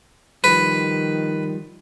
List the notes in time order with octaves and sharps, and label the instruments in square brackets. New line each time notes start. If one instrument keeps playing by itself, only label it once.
[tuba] D#3 [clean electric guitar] F3 G3 [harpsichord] B4